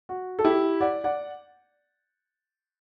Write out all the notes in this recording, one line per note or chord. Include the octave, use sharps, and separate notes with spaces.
F#4
A4
E4 G4
D5 F#5
D5 F#5